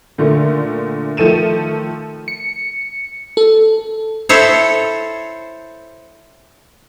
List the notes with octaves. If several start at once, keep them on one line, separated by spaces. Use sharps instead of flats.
A#2 D3 A3
D#3 F3 A3 A4 D#7 E7
C#7
A4
E4 A4 C5 C#5